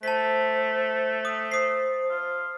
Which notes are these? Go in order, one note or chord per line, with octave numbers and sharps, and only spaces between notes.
A3 C5 A5 B6
D#6
C5 D#6 C7
F4